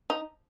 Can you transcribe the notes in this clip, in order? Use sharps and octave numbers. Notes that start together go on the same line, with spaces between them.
D#4